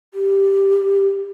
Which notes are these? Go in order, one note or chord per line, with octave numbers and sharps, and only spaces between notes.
G4